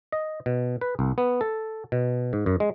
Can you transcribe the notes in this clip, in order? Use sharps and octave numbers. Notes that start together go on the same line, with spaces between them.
D#5
B2
B4
C2
B3
A4
B2
G#2
F#2
G#3